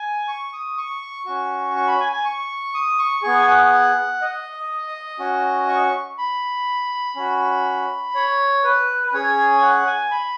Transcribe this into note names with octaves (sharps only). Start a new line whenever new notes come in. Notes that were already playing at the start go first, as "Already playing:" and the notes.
Already playing: G#5
C#6
D#6
C#6
C#4 F#4
C#6
B5
G#5
G#5
C#6
D#6
C#6
B3 G#4 C#6
G#5
F#5
D#5
C#4 F#4
C#6
B5
C#4 F#4
C#5
B4
B4
C#4 G#4 C#5
G#5
F#5
G#5
B5